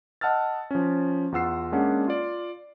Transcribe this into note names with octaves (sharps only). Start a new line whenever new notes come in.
D#5 F#5 A5 E6 F6 A6
F3 C#4
E2 F4 F#5 E6 C7
G#3 A#3 C#4 D4 F#5
F4 D5